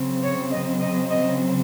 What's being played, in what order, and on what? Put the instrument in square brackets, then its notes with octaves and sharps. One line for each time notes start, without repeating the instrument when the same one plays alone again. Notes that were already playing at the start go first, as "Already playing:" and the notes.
Already playing: [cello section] C#3 F#3 C4
C#5
D#5
D#5
D#5